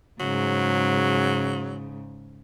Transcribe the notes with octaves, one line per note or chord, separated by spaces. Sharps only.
G#2 C#3 F#3